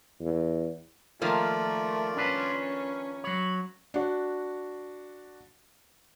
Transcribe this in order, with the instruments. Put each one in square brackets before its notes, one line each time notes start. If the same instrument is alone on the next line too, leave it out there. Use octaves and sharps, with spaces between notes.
[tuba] E2
[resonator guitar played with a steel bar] D#3 F3 A#3 [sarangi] A3 [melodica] F4 D5
[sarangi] C#4 [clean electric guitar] D4 B4
[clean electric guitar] F#3 C#5 [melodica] B5
[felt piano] D4 F#4